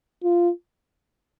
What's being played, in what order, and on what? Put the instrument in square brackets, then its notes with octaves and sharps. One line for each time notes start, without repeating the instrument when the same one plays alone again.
[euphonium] F4